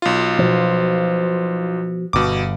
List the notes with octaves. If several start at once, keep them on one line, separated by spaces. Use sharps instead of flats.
B1 F4
B2 F3
G1 B2 D6